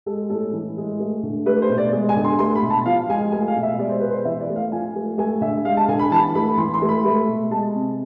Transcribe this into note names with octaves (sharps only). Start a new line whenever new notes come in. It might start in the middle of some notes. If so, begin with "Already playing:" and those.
G#3 A4
A2 A4
E3
G#3
A3
D3
A3 B4
C5
B2
D5
G#3
G#5
D3
C6
A3 C6
B5
B2
A5
F3 F5
G#3 G#5
A3 G#5
F5
B2
E5
G#3 D5
C5
B2 B4
C5
E3 E5
D5
A3
F5
F3 G#5
A3
A3 G#5
D3 E5
G#3 F5
A5
D3 G#5
B5
E3 A5
A3 B5
E3 C6
C6
A3
B5
A3
B2
G#3 A5
C3